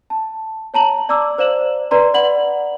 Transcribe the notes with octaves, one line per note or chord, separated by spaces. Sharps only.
A5
C#5 A5 A#5 F#7
D5 A#5 D6 E6
C5 D5 F5 E7 F#7
B4 D5 A#5 C6
D5 F#5 B5 F#7